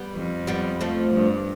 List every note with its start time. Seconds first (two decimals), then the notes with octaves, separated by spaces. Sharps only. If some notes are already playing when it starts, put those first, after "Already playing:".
Already playing: G3 B3
0.15 F2
0.47 G3 B3
0.81 F3 A3
1.13 G2